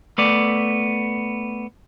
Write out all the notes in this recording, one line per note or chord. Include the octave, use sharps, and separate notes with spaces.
A3 B3 D5